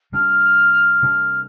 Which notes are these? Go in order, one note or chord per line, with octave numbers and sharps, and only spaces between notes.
C3 G3 D4 F6
C3 G3 D4